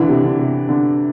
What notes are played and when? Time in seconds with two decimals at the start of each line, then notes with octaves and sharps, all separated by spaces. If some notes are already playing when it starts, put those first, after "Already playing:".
Already playing: D3 E3 E4
0.08 C3
0.24 D3
0.39 C3
0.69 D3